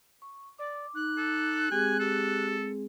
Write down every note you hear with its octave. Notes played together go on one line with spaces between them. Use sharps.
C#6
D5 D6
D#4 F#6
A4
G#3 C4 G4 G#4 G#5
G4 A4